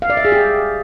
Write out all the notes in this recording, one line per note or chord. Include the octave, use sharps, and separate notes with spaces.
F5
D5
E5
G#4
G4